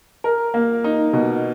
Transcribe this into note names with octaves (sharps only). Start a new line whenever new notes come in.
A#4
A#3
D#4
B2